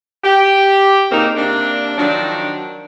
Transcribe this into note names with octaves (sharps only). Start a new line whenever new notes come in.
G4
A#2 C#3 A#3 C4 D#4
C3 A#3 D4
D#3 F3 F#3 D4